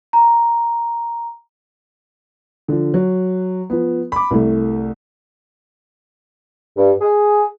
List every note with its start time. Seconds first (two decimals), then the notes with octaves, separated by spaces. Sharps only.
0.13 A#5
2.68 D3 F3
2.94 F#3
3.70 F3 B3
4.12 B5 D6
4.31 C2 A3
6.77 G2
7.00 G#4